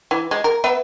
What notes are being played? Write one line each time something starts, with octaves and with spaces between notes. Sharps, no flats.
E3
G#3
A#4
B3 B4 E5